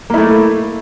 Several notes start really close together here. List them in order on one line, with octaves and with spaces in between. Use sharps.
A#3 E4 A3